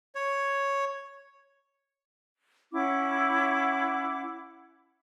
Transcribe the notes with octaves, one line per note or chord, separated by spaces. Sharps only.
C#5
C#4 E4 F#5 D6